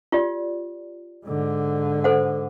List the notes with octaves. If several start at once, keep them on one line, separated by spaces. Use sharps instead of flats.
F4 G4 D5
G#2 D3
A4 C5 F#5